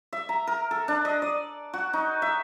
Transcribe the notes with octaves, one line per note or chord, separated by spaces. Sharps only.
E5
A#5
A#4
A4
D4
D#5
D5
F#4
D#4
E5